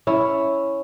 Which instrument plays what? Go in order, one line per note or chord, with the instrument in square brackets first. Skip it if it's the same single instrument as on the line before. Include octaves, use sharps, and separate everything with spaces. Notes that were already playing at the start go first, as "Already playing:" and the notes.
[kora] C#4 E4